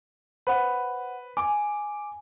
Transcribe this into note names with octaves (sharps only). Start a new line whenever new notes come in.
B4 C5 F#5
G#5 D6